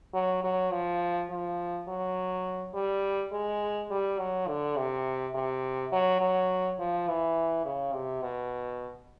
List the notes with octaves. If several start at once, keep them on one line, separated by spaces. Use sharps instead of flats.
F#3
F#3
F3
F3
F#3
G3
G#3
G3
F#3
D3
C3
C3
F#3
F#3
F3
E3
C#3
C3
B2